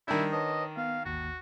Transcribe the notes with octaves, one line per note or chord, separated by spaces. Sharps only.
D#3 G3 D4 E4 G6
B4 C#5 D#5 A5
B3 F5
G#1 D#2 F#4